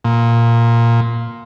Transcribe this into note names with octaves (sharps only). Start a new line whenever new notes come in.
A#2